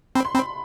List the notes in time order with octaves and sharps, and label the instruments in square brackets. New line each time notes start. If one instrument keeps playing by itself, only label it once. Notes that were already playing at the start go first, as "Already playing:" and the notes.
[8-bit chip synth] C4 [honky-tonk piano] B5
[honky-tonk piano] C6
[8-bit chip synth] C4 [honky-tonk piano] B5